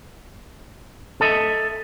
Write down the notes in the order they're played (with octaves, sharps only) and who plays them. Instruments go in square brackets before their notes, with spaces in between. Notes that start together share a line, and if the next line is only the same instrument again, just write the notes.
[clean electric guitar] A4 D#5 E5